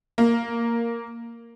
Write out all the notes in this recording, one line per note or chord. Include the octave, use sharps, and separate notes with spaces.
A#3